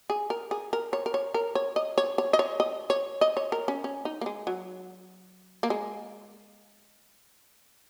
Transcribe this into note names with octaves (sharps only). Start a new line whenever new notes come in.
G#4
A#4
G#4
A#4
C#5
A#4
C#5
A#4
C#5
D#5
C#5
C#5
D#5
C#5
D#5
C#5
D#5
C#5
A#4
C#4
C#4
D#4
A#3
G#3
F#3
A#3
G#3